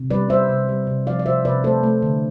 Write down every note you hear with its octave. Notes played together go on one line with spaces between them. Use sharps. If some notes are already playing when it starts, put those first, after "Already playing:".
Already playing: C3
G3 B4 D5
G3 C5 E5
C3
G3
C3
F3 D5 F5
D5
C3 C5 E5
C3 B4 D5
A3 A4 C5
A3
D3